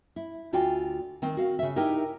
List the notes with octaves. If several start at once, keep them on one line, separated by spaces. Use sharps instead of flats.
E4
D2 F4 F#4 D5 G5 G#5
D#3 C4
F#4 F5
C#3 E5
D#4 E4 G4 A#4 G5